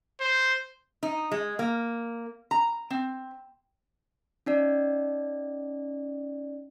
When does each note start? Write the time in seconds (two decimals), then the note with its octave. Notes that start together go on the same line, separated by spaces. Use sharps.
0.20 C5
1.03 D#4
1.31 G#3
1.59 A#3
2.51 A#5
2.90 C4
4.46 C#4 D#4 D5